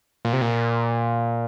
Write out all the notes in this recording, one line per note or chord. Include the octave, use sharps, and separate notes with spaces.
A#2
C3
A#2